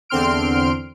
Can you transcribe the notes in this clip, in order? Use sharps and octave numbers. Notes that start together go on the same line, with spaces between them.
E2 D3 C4 C6 F6 D7